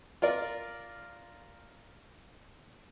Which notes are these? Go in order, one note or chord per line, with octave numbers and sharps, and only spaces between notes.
F4 A#4 D5